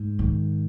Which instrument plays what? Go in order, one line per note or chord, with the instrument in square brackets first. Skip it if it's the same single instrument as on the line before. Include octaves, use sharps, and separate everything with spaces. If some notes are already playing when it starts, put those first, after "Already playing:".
Already playing: [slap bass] G#2
[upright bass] D#3